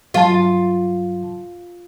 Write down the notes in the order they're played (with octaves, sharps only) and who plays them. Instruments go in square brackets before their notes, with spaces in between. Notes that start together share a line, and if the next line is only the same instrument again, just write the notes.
[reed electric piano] G2 F#3 A5 [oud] F4